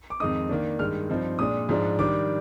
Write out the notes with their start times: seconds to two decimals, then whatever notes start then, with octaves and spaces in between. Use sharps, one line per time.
0.10 D6
0.20 F2 D#3 G#3 D#4 D#6
0.49 D#3 A#3 D4
0.79 G2 D#3 G#3 F6
1.10 G2 F3 C4 D#4
1.39 A#2 G#3 D4 D#6
1.69 G#2 F3 G#3 D4
1.99 D#3 G3 D4 D6